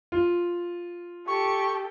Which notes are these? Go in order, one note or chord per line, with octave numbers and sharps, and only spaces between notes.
F4
G4 A4 C#6